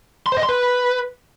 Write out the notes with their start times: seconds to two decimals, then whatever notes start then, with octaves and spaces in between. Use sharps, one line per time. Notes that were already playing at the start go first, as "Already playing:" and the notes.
0.26 C6
0.32 C5
0.38 D#5
0.43 C6
0.49 B4